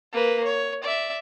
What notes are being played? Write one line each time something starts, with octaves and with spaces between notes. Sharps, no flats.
A#3 B4
C#5
D5 E5